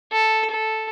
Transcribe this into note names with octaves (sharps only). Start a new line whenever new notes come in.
A4
A4